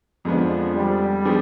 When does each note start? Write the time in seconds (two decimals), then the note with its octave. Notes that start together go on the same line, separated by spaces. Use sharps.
0.25 F2 D3 F3 G#3 B3 D4
0.76 G3
1.25 F3 B3 D4 G#4